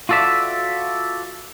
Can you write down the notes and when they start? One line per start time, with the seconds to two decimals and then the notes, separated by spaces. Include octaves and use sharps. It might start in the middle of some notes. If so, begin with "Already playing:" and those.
0.09 F4 F#4 A4 D5 E5